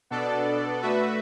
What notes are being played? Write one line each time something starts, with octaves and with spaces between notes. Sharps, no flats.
B2 B3 D4 A4 D5
A3 F#4 B4 E5